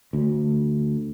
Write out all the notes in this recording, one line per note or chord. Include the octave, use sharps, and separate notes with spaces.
D2